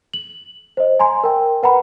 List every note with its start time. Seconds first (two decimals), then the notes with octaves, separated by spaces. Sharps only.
0.14 F#7
0.77 C5 D#5
0.99 G#5 A#5 C6
1.24 A#4 G5
1.63 B4 F#5 A#5 B5